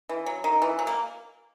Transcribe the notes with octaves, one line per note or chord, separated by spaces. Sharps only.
E3
F#3
D#3
E3
F#3
A#3